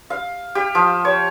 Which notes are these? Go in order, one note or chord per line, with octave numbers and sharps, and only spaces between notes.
F5
G4
F3
C#5